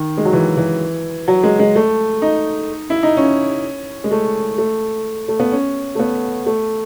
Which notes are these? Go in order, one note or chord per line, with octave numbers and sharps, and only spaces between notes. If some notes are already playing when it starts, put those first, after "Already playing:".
Already playing: D#3
G#3
F#3
E3
E3
F#3
G#3
G#3
A3
D#4
E4
D#4
C#4
G#3
A3
A3
A3
B3
C#4
A3
B3
A3